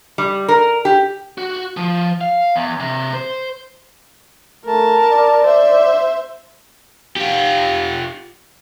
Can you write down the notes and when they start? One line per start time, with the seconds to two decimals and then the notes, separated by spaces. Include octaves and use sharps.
0.18 G3
0.48 A#4
0.85 G4
1.38 F#4
1.77 F3
2.21 F5
2.56 E2
2.80 C3
3.14 C5
4.65 A3 A#4 A5
5.09 D5
5.45 C5 E5
7.16 F4 G4